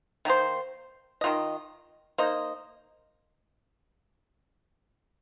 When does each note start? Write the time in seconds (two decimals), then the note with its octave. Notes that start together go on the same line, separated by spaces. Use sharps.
0.25 D#3 A#3 D#4 C5
1.21 D#3 A#3 F4 D#5
2.18 A#3 D#4 C5 D#5